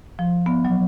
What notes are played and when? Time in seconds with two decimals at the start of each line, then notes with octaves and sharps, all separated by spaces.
0.19 F3
0.46 B3
0.65 F#3